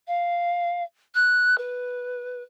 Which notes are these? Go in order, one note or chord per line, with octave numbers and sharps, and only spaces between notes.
F5
F#6
B4